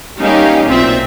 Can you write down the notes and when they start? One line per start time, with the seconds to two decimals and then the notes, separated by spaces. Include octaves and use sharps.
0.20 G3 A#3 C#4 D#4 G4 F5
0.66 B1 A#2 C4 F4 E5